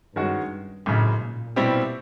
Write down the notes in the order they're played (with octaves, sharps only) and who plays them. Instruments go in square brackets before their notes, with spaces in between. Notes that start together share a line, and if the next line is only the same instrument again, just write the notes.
[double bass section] G2 [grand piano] D#3 G#3 C#4 F#4
[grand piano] G#1 F#2 C#3 [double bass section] A2
[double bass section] A#2
[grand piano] B2 G3 C4 E4 G4